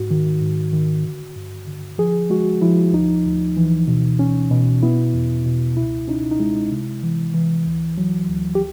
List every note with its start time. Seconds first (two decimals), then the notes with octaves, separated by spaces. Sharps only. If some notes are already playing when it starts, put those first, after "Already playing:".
Already playing: G#2 F#4
0.11 D#3
0.41 G#2
0.73 D#3
1.04 D3
1.36 G2
1.67 D3
1.98 F3 G#4
2.30 G#3 F#4
2.62 F3 E4
2.93 D2 D#4
3.25 D2
3.57 E3
3.88 B2
4.19 C#4
4.51 B2
4.83 B3 E4
5.13 E2
5.46 B2
5.77 C#2 E4
6.08 C#4 D#4
6.31 D#4
6.40 G#3 E4
6.72 C3
7.03 E3
7.34 E3
7.66 D2
7.98 F#3
8.29 D2
8.55 G4